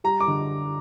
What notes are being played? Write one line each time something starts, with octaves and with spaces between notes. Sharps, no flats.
G3 A#5
D6
D3